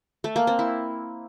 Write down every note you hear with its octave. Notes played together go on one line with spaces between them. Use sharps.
A3
A#3
C4
E4